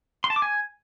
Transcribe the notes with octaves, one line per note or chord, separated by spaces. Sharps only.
C6
A5
D6
G#5